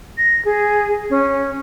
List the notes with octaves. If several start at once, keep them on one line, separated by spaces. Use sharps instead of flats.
A#6
G#4
C#4